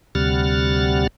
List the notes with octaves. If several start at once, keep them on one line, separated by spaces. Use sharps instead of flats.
D2 C3 G3 F#5 F6 A6